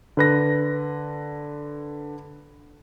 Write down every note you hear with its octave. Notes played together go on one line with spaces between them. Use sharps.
D3 B4 A#6